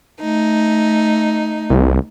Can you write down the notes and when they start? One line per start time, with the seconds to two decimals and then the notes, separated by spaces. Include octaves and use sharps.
0.20 A3 D#4
1.70 C2